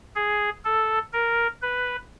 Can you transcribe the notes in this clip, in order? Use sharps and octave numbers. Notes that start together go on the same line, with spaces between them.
G#4
A4
A#4
B4